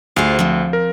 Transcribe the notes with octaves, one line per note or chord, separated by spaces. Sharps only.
D2 F4 G#4 C5
F3 C4
A#4